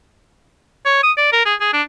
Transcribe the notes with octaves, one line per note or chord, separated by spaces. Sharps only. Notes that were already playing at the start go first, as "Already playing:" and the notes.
C#5
D#6
D5
A#4
G#4
G#4
D4